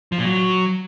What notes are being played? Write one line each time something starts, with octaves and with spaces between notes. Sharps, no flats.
F3
A#2
F#3